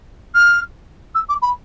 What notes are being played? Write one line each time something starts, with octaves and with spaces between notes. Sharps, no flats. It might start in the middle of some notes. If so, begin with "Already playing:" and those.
F6
E6
D6
B5